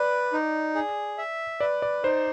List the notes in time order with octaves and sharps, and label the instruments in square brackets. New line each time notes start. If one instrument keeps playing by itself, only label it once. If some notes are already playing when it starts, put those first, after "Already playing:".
Already playing: [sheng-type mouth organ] B4 [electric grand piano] D5
[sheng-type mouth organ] D#4
G#4
E5
[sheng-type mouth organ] B4 [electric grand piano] D5
[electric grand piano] D5
[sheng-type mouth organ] D#4 [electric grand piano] C5